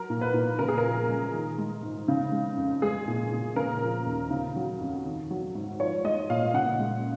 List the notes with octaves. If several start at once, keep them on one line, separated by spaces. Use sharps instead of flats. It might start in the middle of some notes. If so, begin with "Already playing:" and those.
Already playing: F#3 A#4
A#2
B4
A#2
C#3 A#4
G#4
A#4
F3
C#2
D#3
G#3
G#2
C#3
G#3
F2
G#3 G#4
A#2
A#2
C#3 A#4
F3
D#2
C#3
F#3
F2
D#3
F#3
G#2
F3 C#5
G#3 D#5
A#2 F5
C#3 F#5
G#3